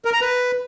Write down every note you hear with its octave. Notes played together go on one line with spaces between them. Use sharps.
A#4
A#5
B4